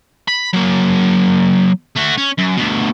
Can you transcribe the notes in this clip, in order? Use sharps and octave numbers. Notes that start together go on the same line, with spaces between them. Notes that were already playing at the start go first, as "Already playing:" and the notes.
B5
F#3 A#3
A3 F#4
C#4
F#2
D2 B2